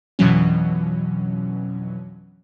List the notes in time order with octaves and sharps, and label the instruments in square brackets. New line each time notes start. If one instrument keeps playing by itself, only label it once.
[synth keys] F2 B2 D3 E3 F#3 C#4